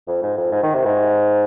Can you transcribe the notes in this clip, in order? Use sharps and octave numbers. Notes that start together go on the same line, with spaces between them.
F2
G#2
F2
G#2
D#3
C3
G#2